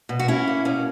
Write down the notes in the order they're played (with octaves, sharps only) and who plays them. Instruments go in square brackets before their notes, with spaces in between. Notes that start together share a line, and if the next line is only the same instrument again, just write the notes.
[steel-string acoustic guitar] B2
F#4
C#4 E4
A#3
B2 C#4